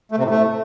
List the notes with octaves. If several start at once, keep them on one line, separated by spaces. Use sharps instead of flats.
A3
C3
A2
A3